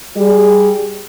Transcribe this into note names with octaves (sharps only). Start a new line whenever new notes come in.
G3 G4 G#4